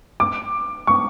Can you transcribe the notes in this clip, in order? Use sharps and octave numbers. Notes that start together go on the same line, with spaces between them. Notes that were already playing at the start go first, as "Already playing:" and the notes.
D6
C#6